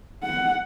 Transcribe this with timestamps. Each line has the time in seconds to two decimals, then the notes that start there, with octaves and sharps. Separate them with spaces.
0.23 F#5